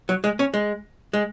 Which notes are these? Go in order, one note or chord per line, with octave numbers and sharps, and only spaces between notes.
F#3
G#3
C#4
G#3
G#3